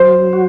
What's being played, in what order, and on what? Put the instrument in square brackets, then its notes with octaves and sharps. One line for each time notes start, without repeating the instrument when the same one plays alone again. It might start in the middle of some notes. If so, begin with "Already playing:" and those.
Already playing: [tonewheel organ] F#3 [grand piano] C5
[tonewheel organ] F#4